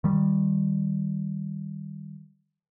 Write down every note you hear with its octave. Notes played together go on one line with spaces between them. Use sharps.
D#3 G3